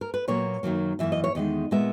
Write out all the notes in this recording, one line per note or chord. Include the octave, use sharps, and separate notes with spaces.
A#4
B4
A#2 F#3 A#3 C#5
F#2 D#3 F#3 A#3
F#2 E3 A#3 E5
D#5
C#5
E2 D#3 G#3 D#5
A#2 G#3 B3 E5